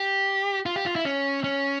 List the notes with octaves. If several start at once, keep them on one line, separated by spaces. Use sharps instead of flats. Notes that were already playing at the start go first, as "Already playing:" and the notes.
Already playing: G4
F4
G4
F4
E4
C#4
C#4